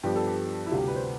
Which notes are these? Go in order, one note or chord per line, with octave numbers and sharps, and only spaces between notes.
G2 F3 B3 G4
A4
G4
E4
D2 C3 G3 F4
G4
B4
C5